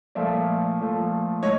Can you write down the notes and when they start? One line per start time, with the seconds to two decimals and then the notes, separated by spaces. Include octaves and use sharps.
0.15 A#2 F3 A3 D5 E5
0.79 A#2 F3 A3
1.43 A2 C#5 D#5